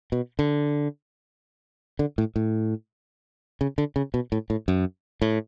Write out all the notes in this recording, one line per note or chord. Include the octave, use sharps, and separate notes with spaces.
B2
D3
D3
A2
A2
C#3
D3
C#3
B2
A2
A2
F#2
A2